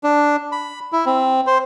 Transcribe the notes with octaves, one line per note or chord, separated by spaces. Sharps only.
D4
B5
E4
C4
C5